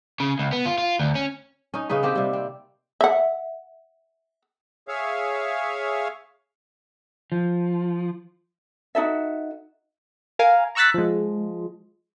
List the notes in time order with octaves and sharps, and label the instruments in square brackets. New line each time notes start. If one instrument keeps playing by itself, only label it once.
[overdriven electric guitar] C#3
C#2
B3
F4
F4
D2
C#4
[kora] C#4 D#4
C#3 C#4 D#4 B4
A#3 C4 G4 B4
C3 G3
C4
[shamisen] E5 F#5
[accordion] G#4 C#5 E5 F5
[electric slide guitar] F3
[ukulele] D#4 F#4 A4 E5
[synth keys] A#4 F5 G#5
A#5 C#6 E6 F#6 A6 B6
F3 G#3